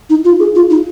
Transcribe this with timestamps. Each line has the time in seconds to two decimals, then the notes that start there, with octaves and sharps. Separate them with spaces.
0.10 D#4
0.25 F4
0.40 G#4
0.55 F4
0.70 D#4